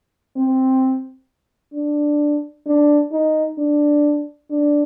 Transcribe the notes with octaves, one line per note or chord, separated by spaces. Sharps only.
C4
D4
D4
D#4
D4
D4